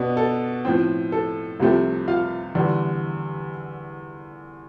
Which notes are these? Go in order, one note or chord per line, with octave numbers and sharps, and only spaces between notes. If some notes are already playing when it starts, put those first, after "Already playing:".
Already playing: B2 B3 D4
A4
A2 F3 C4
A4
C2 C3 F3 A3 C4
F4 F5
E2 D3 G3